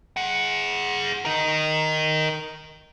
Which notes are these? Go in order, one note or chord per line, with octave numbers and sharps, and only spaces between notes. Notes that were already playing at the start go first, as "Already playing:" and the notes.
G#4 F#5
A#4 D#5